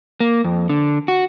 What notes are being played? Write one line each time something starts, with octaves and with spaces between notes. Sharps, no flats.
A#3
F2
D3
F#4